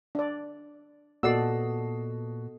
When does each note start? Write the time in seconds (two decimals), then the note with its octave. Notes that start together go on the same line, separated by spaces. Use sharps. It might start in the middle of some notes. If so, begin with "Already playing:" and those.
0.15 D4 D5
1.23 A#2 B3 F#4 A4 D5 D#5 E6 C7